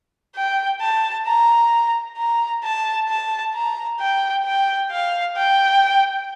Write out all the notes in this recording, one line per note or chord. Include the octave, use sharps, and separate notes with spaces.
G5
A5
A#5
A#5
A5
A5
A#5
G5
G5
F5
G5